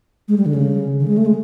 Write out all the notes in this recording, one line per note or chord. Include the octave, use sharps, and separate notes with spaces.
G#3
G3
D3
C#3
D3
G#3
A3
G#3